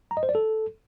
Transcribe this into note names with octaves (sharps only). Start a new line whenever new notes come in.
A#5
D#5
C5
D5
A4